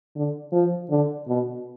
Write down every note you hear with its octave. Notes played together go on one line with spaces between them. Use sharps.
D3
F3
D3
B2